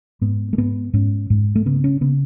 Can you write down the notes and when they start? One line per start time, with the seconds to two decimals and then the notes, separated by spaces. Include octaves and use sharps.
0.21 G#2 B3
0.53 A3
0.58 G#2 B3
0.93 G#2 C#4
1.30 G#2
1.55 A3
1.66 C#3 B3
1.84 C#4
2.01 C#3 B3